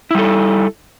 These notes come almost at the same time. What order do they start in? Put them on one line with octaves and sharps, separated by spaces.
E4 G3 A4